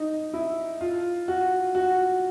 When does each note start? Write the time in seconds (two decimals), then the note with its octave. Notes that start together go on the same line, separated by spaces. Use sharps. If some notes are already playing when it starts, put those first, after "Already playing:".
Already playing: D#4
0.33 E4
0.81 F4
1.28 F#4
1.75 F#4